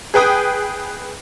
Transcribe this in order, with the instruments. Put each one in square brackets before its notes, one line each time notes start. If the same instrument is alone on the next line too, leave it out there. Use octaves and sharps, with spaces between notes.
[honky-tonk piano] G#4 B4 G5 D#6